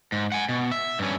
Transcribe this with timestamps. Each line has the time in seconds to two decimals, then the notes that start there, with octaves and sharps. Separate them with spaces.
0.12 G#2
0.32 F#5 G#5
0.49 B2
0.72 E5
0.99 G2 C#4